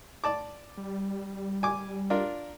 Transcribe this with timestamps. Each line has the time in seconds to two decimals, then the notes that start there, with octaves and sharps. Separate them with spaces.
0.24 D5 A5 D6
0.78 G3
1.63 G#5 D6
2.10 D4 F4 A#4